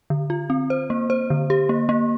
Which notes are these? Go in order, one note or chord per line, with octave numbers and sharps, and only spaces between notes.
D3
F4
C4
C5
A#3
C5
D3
G4
A#3
A#3